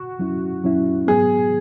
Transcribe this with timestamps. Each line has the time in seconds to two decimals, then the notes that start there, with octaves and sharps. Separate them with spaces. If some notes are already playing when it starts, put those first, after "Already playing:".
Already playing: F#4
0.19 F#2 F#3 C#4 E4
0.63 F#2 F#3 C#4 E4
1.07 G#2 F#3 B3 G#4